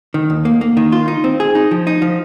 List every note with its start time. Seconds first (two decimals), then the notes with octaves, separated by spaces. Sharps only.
0.14 D#3
0.30 D#2
0.45 A#3
0.61 A#3
0.77 D#3
0.92 F4
1.08 D#4
1.24 C4
1.40 G#4
1.55 D#4
1.71 F3
1.87 D#4
2.02 F3